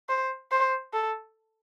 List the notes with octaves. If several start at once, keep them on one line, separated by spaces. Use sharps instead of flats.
C5
C5
A4